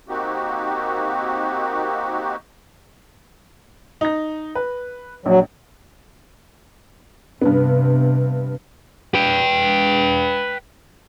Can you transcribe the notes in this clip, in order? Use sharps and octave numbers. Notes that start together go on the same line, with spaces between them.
A#3 C4 D#4 F#4 G4
D#4 A#6
B4
A#1 F#3
G2 C3 B3
B4 G5